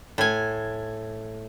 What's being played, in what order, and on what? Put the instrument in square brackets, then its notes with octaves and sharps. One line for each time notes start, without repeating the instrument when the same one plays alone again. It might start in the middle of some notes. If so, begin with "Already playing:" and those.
[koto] A2 G#5